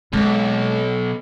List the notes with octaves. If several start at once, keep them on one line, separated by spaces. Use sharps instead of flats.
B1 G#3 A#3